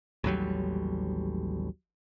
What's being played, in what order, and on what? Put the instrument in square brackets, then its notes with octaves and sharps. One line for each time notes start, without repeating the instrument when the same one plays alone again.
[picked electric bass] A1 D#2 F#3 G3